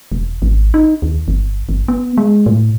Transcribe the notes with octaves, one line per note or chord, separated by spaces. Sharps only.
E1
G#1
D#4
D#2
G1
G1
B3
G#3
A2